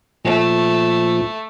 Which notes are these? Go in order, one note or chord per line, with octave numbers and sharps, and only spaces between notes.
A#2 F3 A3